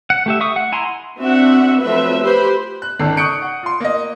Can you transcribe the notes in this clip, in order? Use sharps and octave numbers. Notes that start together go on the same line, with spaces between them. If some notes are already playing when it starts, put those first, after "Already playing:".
F#5
A3 G4 E5
E5 C#6 D#6
F#5
E4 G#5 A#5 C6
C4 D4 F#4 E5 F#5
F3 F#3 A3 C4 B4 E5
G4 B4 C5 B5
F#6
G#1 C#2 D#3 A4 C7
C#6 D#6 F#6 G6 C#7 D7
F#5
F4 C6
A#3 D#5